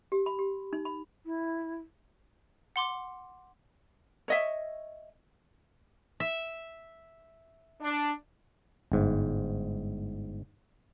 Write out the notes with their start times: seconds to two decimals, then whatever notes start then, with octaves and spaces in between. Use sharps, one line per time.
0.12 G4
0.26 B5
0.39 G4
0.73 D#4
0.85 B5
1.26 E4
2.76 F#5 C6 D6
4.28 C#5 D#5 E5
6.20 E5
7.81 D4
8.92 G1 G#2